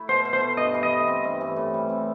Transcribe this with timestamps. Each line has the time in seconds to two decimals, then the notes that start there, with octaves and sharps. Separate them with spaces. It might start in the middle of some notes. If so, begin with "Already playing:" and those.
Already playing: A3 E4
0.09 B2 C5
0.25 B2
0.33 C5
0.41 A3
0.57 G2 D#5
0.74 E3
0.83 D#5
0.91 A3
1.07 C4
1.24 G2
1.41 E3
1.56 A2
1.74 G3
1.89 C4